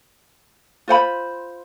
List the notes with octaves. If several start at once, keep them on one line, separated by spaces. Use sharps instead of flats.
F4 C5 F#5 B5